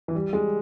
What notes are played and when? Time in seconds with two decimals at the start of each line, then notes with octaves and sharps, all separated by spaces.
0.08 E3
0.15 G3
0.33 G#3